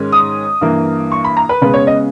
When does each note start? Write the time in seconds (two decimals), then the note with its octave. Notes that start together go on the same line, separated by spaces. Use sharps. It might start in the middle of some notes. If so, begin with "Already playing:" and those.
Already playing: G#2 D#3 G#3 C#4
0.12 D#6
0.61 G2 E3 A#3
1.12 C#6
1.25 B5
1.37 A#5
1.49 B4
1.62 C#3 G#3 B3 B4
1.74 C#5
1.87 D#5